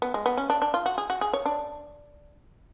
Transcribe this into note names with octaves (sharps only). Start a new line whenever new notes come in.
B3
G#3
B3
C#4
D4
D4
F4
F#4
G#4
F#4
G#4
C#5
D4